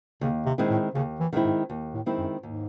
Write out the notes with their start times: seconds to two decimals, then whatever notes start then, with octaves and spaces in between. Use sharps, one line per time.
0.21 D#2 C#3
0.46 C3
0.58 D#3 G#3 C4 E4
0.70 A2
0.95 D#2 C#3
1.20 E3
1.33 D#3 G#3 C4 E4
1.45 G#2
1.70 D#2
1.94 A2
2.06 D#3 G#3 C4 E4
2.19 F#2
2.43 D#2 G#2